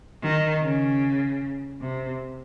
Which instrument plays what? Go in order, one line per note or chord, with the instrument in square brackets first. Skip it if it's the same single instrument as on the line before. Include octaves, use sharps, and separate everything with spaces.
[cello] D#3
C#3
C3